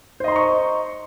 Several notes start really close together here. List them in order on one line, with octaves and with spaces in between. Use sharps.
C5 D#5 C6 A#5 C#6